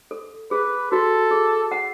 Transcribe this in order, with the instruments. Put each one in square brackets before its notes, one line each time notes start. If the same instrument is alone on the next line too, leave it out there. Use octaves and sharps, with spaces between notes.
[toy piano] A4
[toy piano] G#4 [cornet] B4
[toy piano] F#4 [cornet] A4
[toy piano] G#4
F#5